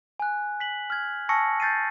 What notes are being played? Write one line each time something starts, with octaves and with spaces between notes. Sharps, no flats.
G#5 F#6
B6 F#7
F6 G#6
G#5 A5 C#6 E6 A#6 C#7
G6 A6 C7 D#7